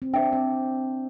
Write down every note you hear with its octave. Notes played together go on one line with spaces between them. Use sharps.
C4
D4 C5 E5 G5
C4